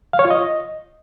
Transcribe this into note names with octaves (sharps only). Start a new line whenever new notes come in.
F5
C#5
F4
D#5